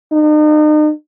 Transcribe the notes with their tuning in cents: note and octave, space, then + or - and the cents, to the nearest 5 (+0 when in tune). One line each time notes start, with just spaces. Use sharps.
D#4 -40